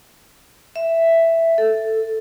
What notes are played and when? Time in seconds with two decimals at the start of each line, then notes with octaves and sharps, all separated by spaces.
0.76 E5
1.58 A4